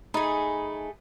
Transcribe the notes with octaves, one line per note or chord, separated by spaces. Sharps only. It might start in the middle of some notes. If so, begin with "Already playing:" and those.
A3 D#4 G#4 B5